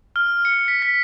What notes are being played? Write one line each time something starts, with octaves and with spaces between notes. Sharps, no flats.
F6
C#7
B6
B6